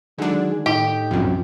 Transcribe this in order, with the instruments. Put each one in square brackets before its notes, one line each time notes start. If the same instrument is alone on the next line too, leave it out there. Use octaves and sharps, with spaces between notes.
[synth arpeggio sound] D3 D4 [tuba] D#3 [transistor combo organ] F#3 G#3 G#4
[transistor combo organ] A2 D#4 [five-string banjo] G4
[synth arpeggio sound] C2 F#2 [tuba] F3